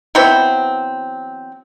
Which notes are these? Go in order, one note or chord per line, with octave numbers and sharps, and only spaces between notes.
E3 F#3 B3 C4